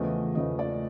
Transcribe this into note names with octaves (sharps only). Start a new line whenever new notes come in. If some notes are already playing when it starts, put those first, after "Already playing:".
Already playing: E2 C#3 F3 A3 D#5
E2 C#3 F3 A3 D#5
D5